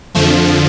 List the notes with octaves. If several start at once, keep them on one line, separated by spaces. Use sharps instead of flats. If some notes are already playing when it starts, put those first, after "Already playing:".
F2 D3 F3 A3